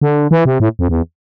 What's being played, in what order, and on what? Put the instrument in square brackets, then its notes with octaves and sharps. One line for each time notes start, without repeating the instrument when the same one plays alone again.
[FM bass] D3
E3
C3
A2
F2
E2